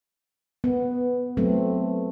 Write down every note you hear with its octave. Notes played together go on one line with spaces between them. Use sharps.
B3
F#3 A3 C4